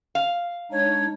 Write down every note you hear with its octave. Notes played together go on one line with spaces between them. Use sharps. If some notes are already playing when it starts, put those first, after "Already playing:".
F5
G#3 D4 D#4 C#5